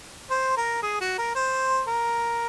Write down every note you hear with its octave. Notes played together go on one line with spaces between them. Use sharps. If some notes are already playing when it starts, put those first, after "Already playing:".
C5
A#4
G#4
F#4
A#4
C5
A#4